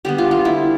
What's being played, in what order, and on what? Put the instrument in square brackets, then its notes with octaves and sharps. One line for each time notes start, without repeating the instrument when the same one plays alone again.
[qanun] D3 G3 B3 G4
F4
F4
E4